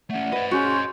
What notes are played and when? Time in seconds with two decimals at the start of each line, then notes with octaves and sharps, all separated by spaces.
0.10 A3 C#4 D5 E5 F#5
0.32 B4 C5 D#5
0.51 C#4 F#4 G#4 C6 G6